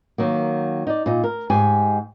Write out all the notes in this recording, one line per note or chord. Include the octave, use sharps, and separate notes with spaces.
D#3 F#3 A#3
D#4 D5
A#2 D#4
A#4
G#2 G4 G#5